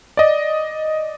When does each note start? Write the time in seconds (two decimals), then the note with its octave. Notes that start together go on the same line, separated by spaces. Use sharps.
0.17 D5 D#5